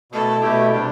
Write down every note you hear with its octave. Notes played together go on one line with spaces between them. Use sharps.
B2 A3 E4 A4
B2 A3 E4 G4
C3 G3 D4